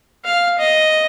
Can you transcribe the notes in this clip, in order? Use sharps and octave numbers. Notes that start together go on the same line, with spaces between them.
F5
D#5